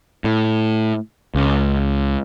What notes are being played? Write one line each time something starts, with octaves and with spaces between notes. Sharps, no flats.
A2
C#2